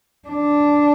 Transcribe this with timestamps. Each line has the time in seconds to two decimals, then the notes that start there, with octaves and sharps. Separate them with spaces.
0.29 D4